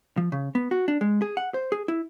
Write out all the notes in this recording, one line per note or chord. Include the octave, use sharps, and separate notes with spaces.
F3
C#3
B3
F#4
D4
G#3
G#4
F#5
C5
G#4
E4